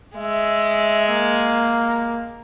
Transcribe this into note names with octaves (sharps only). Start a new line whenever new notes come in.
G#3 E5
A#3